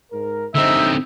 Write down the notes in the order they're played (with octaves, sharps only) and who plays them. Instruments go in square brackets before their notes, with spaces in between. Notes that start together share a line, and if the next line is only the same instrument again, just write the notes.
[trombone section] G#2 A#4
[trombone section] G2 D#4 [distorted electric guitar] D3 C4 [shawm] E5